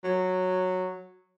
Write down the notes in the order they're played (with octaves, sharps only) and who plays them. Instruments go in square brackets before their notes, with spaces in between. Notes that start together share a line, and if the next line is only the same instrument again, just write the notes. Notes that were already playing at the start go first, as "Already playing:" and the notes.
[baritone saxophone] F#3